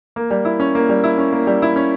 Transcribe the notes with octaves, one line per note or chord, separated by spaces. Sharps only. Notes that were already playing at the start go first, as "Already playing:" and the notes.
A#3
G3
E4
C#4
A#3
G3
E4
C#4
A#3
G3
E4
C#4